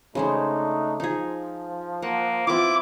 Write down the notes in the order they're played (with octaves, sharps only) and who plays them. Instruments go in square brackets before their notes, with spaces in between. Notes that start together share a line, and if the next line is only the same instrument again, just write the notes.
[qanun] C#3 G#3 C5 [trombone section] A3 D4 D#4
[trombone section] F3 [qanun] D#4 G#4
[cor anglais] A#3 [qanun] F#5
[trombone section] F3 B3 [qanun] C4 F4 [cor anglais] E4 [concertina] D6